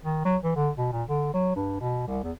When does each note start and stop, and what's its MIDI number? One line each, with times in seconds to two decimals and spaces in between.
0.03 0.20 51
0.25 0.37 54
0.44 0.52 52
0.56 0.70 50
0.78 0.89 47
0.92 1.03 46
1.09 1.32 50
1.34 1.55 54
1.56 1.77 43
1.81 2.04 47
2.07 2.23 36
2.23 2.32 40